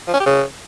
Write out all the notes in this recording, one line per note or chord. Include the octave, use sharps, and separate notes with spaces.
F3
C#4
G4
C#3